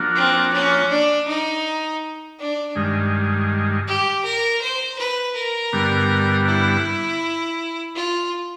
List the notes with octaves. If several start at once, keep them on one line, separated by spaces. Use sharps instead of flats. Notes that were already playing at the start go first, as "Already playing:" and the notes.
Already playing: F3 A#3 D4 F#4
C4
C#4
D4
D#4
D4
G2 D#3 G#3
G4
A#4
C5
B4
A#4
G2 D3 G3 B3
E4
F4